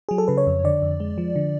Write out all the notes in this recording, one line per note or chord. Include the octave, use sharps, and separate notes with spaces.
F#3 G#4
A4
C#3 B4
C#5
F2
D3 D5
F2
G#3
F3
D3